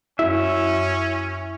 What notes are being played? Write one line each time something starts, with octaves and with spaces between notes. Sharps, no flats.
F#2 C#4 E4 E5